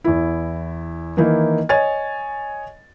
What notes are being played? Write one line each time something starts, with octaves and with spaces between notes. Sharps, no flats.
E2 E4
D#3 E3 A#3 D#4 E4
C#5 D#5 G#5 A6